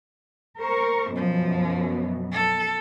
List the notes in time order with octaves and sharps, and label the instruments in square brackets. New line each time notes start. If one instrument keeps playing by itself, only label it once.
[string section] A#4 C#6 [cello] C5
[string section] F#2 B2 [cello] F3
[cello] A4